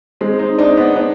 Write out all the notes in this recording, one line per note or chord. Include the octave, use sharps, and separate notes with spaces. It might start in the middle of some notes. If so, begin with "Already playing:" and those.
G#3 C4
C4 D#4
C4 D4 D#4
B3 D4
B3 D4